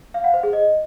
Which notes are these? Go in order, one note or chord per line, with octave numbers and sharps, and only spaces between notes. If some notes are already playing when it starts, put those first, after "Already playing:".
F5
F#5
C5
G#4
D#5